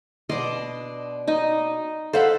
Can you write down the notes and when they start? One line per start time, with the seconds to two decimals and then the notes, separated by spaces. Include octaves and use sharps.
0.29 B2 D4 D#5 C6 D6
1.28 D#4 D#5
2.13 A4 C5 F5 F#5 B5